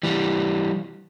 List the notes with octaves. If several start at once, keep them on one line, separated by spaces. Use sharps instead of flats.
E3 G3